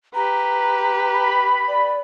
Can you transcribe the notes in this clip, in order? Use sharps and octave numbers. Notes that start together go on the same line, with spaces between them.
G4 B4 A#5
B5
D5